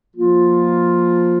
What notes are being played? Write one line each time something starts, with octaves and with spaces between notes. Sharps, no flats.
F3 A#3 F4